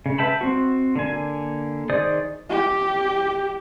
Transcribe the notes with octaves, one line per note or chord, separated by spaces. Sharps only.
C#3
B4 E5 G5 A5 B5
C4 F#4
D3 A#3 G#5
D#3 G#4 C5 D5 D#6
G4